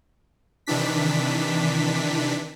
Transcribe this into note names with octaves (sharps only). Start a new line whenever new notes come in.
C3 D#3 E3 D4 B6